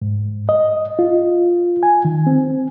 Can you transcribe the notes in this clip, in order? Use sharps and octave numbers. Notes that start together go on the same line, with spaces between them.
G#2
D#5
F4
G#5
D#3
C4